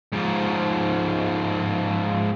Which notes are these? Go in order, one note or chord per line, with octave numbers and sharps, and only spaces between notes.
G#2 F3